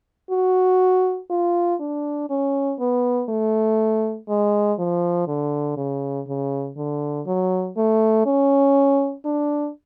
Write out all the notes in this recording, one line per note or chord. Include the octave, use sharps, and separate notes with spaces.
F#4
F4
D4
C#4
B3
A3
G#3
F3
D3
C#3
C#3
D3
F#3
A3
C#4
D4